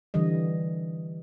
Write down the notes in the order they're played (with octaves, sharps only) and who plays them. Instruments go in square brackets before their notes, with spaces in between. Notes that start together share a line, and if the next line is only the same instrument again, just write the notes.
[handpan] D3 E3 G3 D#5